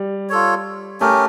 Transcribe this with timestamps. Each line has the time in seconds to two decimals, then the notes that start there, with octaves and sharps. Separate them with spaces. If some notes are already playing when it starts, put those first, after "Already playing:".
Already playing: G3
0.29 F4 A4 C#5
1.01 A3 C#4 G4 A#4